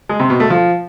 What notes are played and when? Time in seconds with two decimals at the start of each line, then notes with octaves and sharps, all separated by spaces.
0.09 G#3
0.20 C3
0.30 B2
0.40 A3
0.50 F3